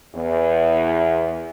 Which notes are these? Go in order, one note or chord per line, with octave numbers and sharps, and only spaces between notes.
E2